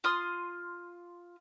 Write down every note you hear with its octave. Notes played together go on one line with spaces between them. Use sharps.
F4 C6 D#6